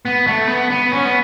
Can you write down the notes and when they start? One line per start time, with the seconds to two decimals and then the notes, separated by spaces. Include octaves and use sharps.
0.05 B3
0.27 A3
0.49 B3
0.70 B3
0.92 C#4
1.05 B3